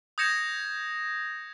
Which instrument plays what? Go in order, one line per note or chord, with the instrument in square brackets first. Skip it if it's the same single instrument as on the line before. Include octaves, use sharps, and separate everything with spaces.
[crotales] D#6 G6 G#6 A#6 C#7 E7